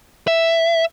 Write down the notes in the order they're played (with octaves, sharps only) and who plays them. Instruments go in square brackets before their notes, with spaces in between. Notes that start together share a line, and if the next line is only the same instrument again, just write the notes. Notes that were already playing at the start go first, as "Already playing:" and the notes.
[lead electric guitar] E5